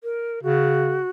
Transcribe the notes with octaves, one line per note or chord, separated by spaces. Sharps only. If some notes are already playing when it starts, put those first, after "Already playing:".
A#4
C#3 F#4